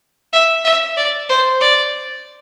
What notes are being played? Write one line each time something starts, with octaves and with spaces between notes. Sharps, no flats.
E5
E5
D5
C5
D5